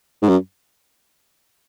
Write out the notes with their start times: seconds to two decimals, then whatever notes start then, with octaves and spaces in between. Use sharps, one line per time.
0.22 G#2
0.29 F#2